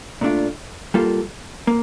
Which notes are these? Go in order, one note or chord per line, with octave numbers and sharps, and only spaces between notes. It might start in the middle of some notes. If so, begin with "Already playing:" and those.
A#2 A3 D4 F4
G3 A#3 F4 A4
A#3